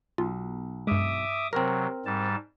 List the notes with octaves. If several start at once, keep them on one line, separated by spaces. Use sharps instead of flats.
B1 F4
G2 G#3 E5 D6 D#6
C3 F#3 C4 A#4
G#2 G3 A5